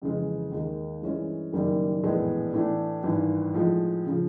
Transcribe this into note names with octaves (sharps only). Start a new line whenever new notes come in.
F2 C#3 E3 G#3
D#2 D#3 G#3
G2 E3 G#3 C#4 E4
F#1 F#2 D#3 G3 A#3
A#1 A2 E3 G#3 B3
A2 E3 A3 D4
G#1 G2 E3
A2 F3 G#3
C#3 F3